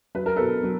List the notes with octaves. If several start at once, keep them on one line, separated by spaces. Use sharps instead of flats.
F#3 B4
A#4
B2 A4 B4
F#3